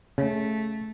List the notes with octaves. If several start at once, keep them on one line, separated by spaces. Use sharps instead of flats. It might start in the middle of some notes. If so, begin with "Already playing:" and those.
C#3 A3